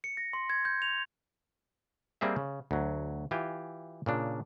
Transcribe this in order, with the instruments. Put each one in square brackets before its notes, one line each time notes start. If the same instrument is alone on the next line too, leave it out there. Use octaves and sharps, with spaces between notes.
[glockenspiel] C#7
A#6
C6
G#6
G6
F7
[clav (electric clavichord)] G3 A#3 C4 G#4 E5
C#3
D2 F#3
E3 F4 G4 G#5
A#2 C#3 D4